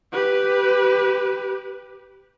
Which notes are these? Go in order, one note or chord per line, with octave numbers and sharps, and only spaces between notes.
G4 B4